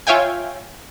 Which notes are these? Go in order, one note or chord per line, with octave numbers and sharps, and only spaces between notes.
F4 C#5 E5 F5 G5 G#5